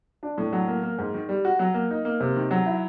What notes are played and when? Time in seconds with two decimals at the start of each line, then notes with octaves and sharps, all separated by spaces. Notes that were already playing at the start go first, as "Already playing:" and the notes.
0.23 D4
0.38 A2
0.53 F#3
0.68 A#3
0.83 A#3
0.99 G#2
1.14 D#3
1.29 G3
1.45 F#4
1.59 F#3
1.74 A#3
1.90 D#4
2.05 A#3
2.20 C3
2.36 D#3
2.51 F#3
2.66 E4